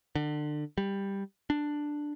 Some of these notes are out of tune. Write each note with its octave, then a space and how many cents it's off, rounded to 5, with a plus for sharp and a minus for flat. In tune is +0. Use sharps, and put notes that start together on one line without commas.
D3 +30
G3 +10
D4 +5